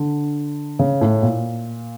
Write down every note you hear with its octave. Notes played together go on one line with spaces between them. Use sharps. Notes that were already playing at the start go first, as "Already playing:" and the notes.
Already playing: D3
C#3
A2
A#2